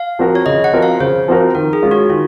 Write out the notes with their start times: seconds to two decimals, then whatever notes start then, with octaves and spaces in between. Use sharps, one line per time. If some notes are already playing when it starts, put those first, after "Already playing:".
Already playing: F5
0.19 F3 C4 F#4 A#4
0.35 C#5
0.46 C#3 D#5
0.64 F#5
0.73 F3 C4 F#4 A#4
0.82 F5
1.00 C#3 C5
1.28 F3 C4 F#4 A#4
1.55 D#3 A#4
1.73 G#4
1.82 G#3 C#4 F4
1.91 F#4
2.09 D#3 F4